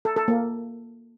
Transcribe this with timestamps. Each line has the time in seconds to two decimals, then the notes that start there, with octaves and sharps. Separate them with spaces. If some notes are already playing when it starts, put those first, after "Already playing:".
0.05 A4
0.16 A4
0.28 A#3